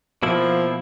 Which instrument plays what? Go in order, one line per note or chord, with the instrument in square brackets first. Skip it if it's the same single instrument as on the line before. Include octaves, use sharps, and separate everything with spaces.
[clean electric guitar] B2 A#3 E4 [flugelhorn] F3